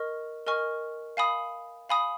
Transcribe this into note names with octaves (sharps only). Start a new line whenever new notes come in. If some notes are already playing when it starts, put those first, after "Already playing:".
Already playing: A#4 D#5 C#6 F6
A#4 D#5 G#5 C#6 F6
F5 G#5 B5 D#6
F5 G#5 B5 D#6